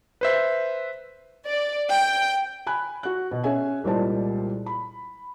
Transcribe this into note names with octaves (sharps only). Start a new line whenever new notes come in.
B4 C5 E5
D5
G5
G#5 B5 F#6
F#4 F#6
B2
C#4 G#4 C#5 E5 G#5
C2 A#2 G3 G#3 C5 A5
B5